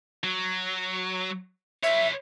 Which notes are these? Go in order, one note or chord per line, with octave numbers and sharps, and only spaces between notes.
F#3
B4 C#5 E5